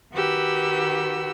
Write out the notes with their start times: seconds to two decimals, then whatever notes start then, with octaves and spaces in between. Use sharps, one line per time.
0.13 D#3 F#4 G4 B4 E6